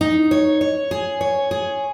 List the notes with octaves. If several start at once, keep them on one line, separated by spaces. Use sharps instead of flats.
D#4
C#5
C#5
G#4
C#5
G#4